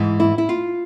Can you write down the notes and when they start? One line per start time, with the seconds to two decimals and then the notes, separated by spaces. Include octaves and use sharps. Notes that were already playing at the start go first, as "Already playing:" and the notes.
Already playing: G#2 E3
0.20 E4
0.38 E4
0.49 F4